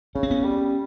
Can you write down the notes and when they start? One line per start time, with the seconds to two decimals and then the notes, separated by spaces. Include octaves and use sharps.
0.15 C#3 C#4
0.23 C4
0.30 B3 C#4
0.44 G3